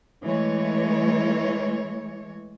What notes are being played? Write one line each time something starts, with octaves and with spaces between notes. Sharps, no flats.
E3 G#3 A3 C#5